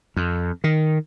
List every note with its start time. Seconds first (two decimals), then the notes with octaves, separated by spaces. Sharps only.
0.17 F2
0.64 D#3